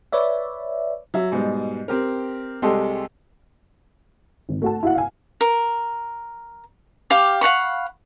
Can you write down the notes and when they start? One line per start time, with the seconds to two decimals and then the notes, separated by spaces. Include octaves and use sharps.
0.12 B4 C#5 D5 E5
1.14 F#3 E5
1.32 G#2 B2 G3
1.88 C4 G4 A#4
2.62 C2 G#3 G4 A4 C6
4.49 G#1
4.62 A3 F#4 A5
4.83 E4 F#4 F5 F#5
4.95 F5 G#5
5.41 A#4
7.10 G4 F5 D6
7.41 F5 F#5 B5 C#6